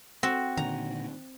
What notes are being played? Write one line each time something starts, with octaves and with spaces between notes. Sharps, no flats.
C4 F#4
A#2 D3 D#3 A#5